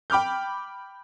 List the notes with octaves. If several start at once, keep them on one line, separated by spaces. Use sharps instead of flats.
G5 B5 D6 F6 G6